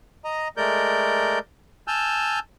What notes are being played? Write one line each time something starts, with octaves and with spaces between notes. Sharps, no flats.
D#5 A#5
G#3 A3 A#4 D5 G6
G#5 A5 E6 F6 G6